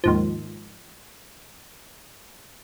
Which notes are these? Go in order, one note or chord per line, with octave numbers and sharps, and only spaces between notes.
D#2 G#2 F3